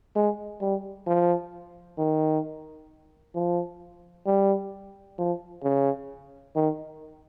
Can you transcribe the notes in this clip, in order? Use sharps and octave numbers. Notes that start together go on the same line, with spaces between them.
G#3
G3
F3
D#3
F3
G3
F3
C#3
D#3